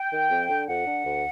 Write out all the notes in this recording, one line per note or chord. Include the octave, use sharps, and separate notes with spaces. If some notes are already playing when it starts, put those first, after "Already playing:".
Already playing: G5
D#3
F2
D3
F2 F#5
D3
D2